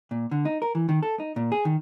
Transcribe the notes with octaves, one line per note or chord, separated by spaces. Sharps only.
A#2
D3
D#4
A#4
E3
D#3
A4
D#4
A#2
G#4
D#3